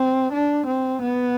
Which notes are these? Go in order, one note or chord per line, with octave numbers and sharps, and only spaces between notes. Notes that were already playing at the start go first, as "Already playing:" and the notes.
Already playing: C4
D4
C4
B3